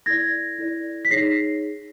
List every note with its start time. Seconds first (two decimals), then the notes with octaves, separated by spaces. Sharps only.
0.06 E4 A4 D5 G#6 A#6
0.58 E4 A4 D5
1.05 B6
1.10 D#4 G#4 C#5 A#6 C7